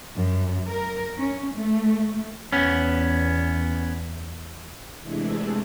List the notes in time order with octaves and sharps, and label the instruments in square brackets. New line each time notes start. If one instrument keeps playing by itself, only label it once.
[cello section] F#2
A#4
C#4
A3
[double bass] E2 [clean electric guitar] B3 C#4
[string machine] C3 E3 G#3 A3 D4 E4